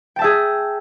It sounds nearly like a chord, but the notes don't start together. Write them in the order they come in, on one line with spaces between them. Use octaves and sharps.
G5 A5 E5 G#4